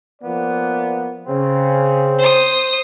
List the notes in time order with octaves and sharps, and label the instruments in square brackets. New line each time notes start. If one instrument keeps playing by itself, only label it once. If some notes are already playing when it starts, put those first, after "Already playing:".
[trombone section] F3 A#3 B3 [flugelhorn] D5
[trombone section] C#3 [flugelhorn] C4
[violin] C5 D#6